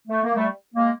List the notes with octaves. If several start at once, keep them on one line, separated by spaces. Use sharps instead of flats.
A3
A#3
G3 A3
G#3 A#3